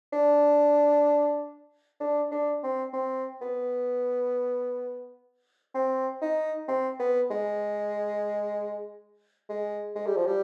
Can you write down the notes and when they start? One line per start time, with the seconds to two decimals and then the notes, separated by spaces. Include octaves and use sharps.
0.13 D4
2.00 D4
2.31 D4
2.63 C4
2.93 C4
3.41 B3
5.74 C4
6.21 D#4
6.68 C4
6.99 B3
7.30 G#3
9.49 G#3
9.96 G#3
10.06 G3
10.17 F3
10.27 G3